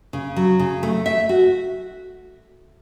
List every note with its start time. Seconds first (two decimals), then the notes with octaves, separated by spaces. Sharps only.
0.13 C#3
0.36 F#3
0.59 C#3
0.83 A3
1.06 E5
1.29 F#4